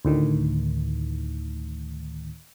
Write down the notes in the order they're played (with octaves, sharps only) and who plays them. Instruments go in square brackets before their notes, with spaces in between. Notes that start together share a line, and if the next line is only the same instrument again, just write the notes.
[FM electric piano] D2 A2 D#3